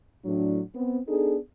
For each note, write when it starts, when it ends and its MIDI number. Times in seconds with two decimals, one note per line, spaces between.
0.25 0.60 45
0.25 0.60 54
0.25 0.60 62
0.75 0.98 59
0.75 0.98 60
1.07 1.36 59
1.07 1.36 62
1.07 1.36 63
1.07 1.36 68
1.07 1.36 69